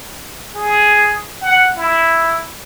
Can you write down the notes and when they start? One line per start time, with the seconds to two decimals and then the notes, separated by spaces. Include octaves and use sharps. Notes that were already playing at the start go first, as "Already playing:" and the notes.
0.55 G#4
1.42 F#5
1.77 E4